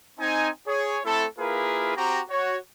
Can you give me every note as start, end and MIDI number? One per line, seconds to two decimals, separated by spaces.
0.19 0.49 60
0.19 0.49 63
0.19 0.49 80
0.67 1.00 68
0.67 1.00 73
1.05 1.26 57
1.05 1.26 60
1.05 1.26 64
1.05 1.26 69
1.39 1.95 58
1.39 1.95 64
1.39 1.95 65
1.39 1.95 68
1.39 1.95 70
1.39 1.95 71
1.96 2.22 60
1.96 2.22 66
1.96 2.22 67
1.96 2.22 82
2.29 2.57 66
2.29 2.57 73